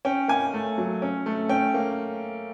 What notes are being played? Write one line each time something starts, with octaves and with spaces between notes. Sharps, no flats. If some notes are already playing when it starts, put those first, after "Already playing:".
C#4 G5
A#3 G#5
A3
F#3
C#4
A3
C#4 G5
A#3